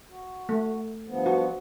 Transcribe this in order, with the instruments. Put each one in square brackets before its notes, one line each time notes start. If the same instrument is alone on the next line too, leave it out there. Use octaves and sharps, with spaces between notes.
[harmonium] F#4
[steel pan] A3
[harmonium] G2 F3 B3
[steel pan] F#4